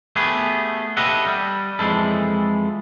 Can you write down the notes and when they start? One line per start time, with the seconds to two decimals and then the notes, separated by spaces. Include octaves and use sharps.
0.16 A3 B3 G4 G#4
0.97 G4 A4 B4 D#5 E5 F#5
1.27 G3
1.79 F2 E3 G#3 E4 A4